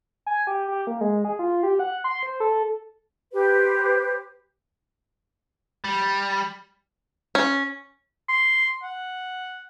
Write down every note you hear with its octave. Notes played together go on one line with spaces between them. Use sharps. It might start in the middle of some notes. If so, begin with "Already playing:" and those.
G#5
G4
G4
A#3
G#3
G#4
F4
G4
F#5
C6
C5
A4
G4 B4 C5
G3
C#4
C6
F#5